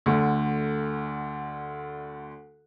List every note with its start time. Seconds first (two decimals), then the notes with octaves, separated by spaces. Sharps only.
0.06 D2 D3 A3